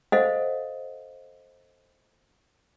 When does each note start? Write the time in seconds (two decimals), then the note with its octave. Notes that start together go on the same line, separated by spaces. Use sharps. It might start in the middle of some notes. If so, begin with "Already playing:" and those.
0.12 A4 C5 D#5 F5 F#5